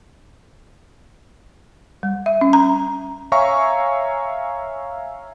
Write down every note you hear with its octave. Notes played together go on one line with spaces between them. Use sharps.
G3
E5
C#4
A#5
C#5 E5 F5 G#5 A#5 C#6